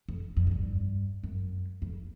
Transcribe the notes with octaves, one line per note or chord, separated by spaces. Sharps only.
F2
F2
G#2
G2
F#2
F2